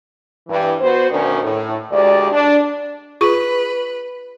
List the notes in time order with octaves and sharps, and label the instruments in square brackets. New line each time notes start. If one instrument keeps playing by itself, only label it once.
[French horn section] G2 E3
B3 F#4 C5
D2 B2 D#3 C#4 D4
A2
D2 G#3 G4 D5
D4
[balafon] F4 G#4 C#6 [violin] B4